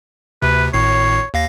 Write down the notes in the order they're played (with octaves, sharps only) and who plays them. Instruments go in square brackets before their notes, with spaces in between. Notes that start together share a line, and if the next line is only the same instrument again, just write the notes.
[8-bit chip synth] D2 C3 [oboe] B4
[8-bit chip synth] G#1 A2 C7 [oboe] C#5
[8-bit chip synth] D#2 F5 A#6